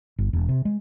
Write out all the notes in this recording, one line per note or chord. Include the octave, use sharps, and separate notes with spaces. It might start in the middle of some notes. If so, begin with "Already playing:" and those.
G1
E1
C3
G#3